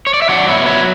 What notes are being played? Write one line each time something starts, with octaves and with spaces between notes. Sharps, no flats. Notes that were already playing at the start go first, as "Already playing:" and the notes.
C#5
D5
E5
F#3 D5 F#5
B3 C#5 E5
F#3 C#5 E5